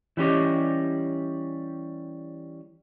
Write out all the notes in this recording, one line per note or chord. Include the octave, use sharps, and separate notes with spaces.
E3 G3 C#4 G4 D#5